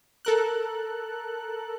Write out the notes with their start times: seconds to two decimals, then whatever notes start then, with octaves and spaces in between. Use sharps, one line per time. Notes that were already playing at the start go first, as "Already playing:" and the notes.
0.25 A4 A#4 F#6